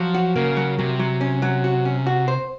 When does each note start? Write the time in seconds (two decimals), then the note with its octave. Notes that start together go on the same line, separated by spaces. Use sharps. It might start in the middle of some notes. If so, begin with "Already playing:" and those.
Already playing: F3 F#3
0.15 F#4
0.36 C#3 A#3
0.57 F#3
0.79 C3 F#3
0.99 F#3
1.21 C#4
1.42 F#3
1.64 F#4
1.85 C#4
2.07 F#4
2.28 C5